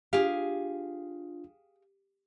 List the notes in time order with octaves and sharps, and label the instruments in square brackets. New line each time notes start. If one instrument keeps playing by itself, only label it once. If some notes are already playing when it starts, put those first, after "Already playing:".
[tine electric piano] D4 F4 [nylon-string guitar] G4 [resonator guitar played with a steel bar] G#4 F5